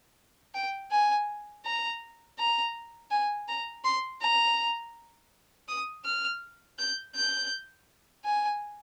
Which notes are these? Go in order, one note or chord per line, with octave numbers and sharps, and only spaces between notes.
G5
G#5
A#5
A#5
G#5
A#5
C6
A#5
D#6
F6
G6
G6
G#5